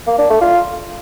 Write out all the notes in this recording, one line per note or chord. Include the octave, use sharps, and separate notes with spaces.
A#3
D4
A3
F4